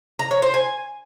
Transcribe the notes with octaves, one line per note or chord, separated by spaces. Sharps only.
A#5
C#5
C5
G#5